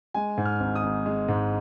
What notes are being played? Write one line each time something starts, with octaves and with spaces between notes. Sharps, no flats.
G#3 G#5
G#2
F6
G#1
D#6
G#1
G#3
G#2